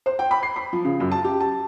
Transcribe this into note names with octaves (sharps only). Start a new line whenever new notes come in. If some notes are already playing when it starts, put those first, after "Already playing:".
C5
G5
B5
C7
B5
F3
C#3
F#2
A5
G4
A5